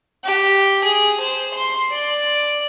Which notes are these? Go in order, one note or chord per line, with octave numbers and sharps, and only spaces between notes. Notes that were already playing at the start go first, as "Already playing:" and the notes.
G4
G#4
C5
C6
D5